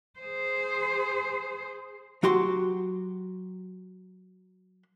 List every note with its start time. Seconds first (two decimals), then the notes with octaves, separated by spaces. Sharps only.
0.19 G#4 C5
2.23 F#3 F#4 G4 C6